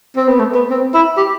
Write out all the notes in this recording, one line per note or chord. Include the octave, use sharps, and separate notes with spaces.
C4
B3
A3
B3
C4
E4
G4